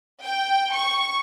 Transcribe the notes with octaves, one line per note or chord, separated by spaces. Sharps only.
G5
C#6